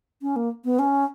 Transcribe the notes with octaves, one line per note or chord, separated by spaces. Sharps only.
C#4
A#3
B3
C#4